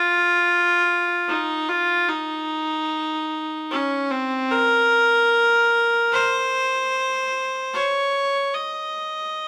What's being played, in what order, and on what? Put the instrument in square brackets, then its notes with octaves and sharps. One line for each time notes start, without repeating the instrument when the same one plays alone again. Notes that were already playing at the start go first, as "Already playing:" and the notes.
Already playing: [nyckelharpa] F4
D#4
F4
D#4
C#4
C4
A#4
C5
C#5
D#5